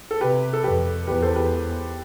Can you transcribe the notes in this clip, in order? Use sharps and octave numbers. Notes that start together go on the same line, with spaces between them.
A4
C3 G4 B4
A4
F2 G4 B4
E2 G4 B4
A4 C5
G4 B4